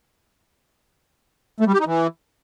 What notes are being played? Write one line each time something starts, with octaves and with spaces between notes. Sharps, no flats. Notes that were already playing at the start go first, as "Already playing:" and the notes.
A3
G3
G4
D#4
E3